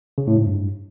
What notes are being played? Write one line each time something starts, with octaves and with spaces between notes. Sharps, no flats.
C#3
A2
G#2
G2